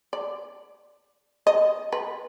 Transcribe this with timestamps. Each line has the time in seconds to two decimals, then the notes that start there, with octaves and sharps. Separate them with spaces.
0.13 D5
1.47 D#5
1.92 B4